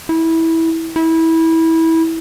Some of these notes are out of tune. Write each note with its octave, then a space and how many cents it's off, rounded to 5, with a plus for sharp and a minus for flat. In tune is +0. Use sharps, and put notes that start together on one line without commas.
E4 -15
E4 -20